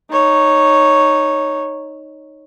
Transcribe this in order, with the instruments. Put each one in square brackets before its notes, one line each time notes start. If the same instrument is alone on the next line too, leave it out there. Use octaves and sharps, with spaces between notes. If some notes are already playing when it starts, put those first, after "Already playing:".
[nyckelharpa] D#4 C#5